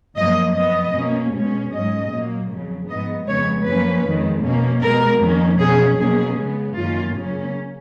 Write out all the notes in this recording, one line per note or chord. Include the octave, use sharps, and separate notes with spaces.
F#2 F3 A#3 D#5
F2 F3 B3 D#5
B2 A#3 C#4
B2 G#3 C#4
G#2 F#3 C#4 D#5
A#2 F#3 A#3
F2 C#3 F#3
G#2 F3 B3 D#5
F2 C#3 G#3 B3 C#5
F#2 F3 A#3 C#4 B4
F2 D#3 G#3
B2 A#3 C#4
B2 G#3 B3 A#4
F2 D#3 A#3 C#4
B2 F#3 C#4 G#4
B2 F#3 A#3 C#4 G#4
C#3 G#3 B3
F#2 D#3 A#3 C#4 F4
C#3 F#3 A#3 C#4